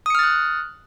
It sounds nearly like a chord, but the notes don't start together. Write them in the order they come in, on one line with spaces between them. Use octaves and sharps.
D#6 C#7 F6 A6 F#6